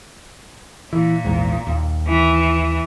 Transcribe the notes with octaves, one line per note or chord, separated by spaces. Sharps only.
A#2 E3
A#1 E2 G#2
D#2
E3